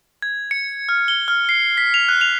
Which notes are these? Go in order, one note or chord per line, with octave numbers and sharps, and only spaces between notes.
G#6
C#7
F6
G7
F6
C7
B6
F7
F#6
F7